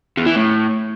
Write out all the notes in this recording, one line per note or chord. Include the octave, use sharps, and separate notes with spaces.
E2
E3
A2